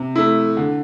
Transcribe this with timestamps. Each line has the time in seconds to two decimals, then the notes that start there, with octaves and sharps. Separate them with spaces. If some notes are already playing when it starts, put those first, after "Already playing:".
Already playing: C3
0.16 A3 E4
0.57 D3